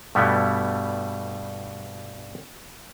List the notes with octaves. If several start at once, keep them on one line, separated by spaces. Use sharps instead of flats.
G2 B2 G3 A3 B3 E4